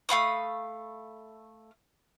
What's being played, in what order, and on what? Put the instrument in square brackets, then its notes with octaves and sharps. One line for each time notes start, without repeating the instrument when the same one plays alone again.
[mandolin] A3 F5 B5 D#6